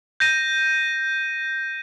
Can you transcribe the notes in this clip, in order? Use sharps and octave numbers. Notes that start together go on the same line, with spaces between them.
G6 A#6 D#7